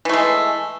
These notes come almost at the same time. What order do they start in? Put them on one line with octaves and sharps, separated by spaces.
E3 A3 G#3